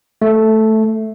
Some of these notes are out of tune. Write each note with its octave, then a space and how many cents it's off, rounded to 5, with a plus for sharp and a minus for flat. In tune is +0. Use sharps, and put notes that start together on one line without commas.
A3 -5